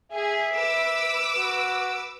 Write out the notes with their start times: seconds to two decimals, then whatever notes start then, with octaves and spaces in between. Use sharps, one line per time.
0.12 G#4 E5
0.55 B4 D6 E6
1.38 F#4